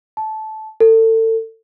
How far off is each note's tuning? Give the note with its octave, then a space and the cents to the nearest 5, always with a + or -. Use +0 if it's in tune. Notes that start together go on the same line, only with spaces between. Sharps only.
A5 -15
A4 +30